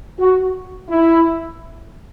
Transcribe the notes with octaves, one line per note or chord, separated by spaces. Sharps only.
F#4
E4